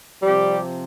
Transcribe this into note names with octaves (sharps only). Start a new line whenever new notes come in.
C3 F3 G3 C4 G4